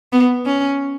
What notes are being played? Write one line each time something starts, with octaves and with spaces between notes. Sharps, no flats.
B3
C#4